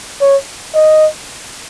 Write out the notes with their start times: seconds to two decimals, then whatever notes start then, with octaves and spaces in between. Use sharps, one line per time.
0.21 C#5
0.74 D#5